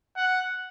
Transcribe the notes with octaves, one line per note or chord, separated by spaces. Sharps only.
F#5